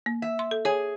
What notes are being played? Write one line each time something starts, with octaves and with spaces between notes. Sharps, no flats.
A#3
E5
C6
A4
G#4 C#5 G#5